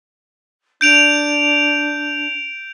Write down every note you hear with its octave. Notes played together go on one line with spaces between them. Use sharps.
D4 G6 D7 F7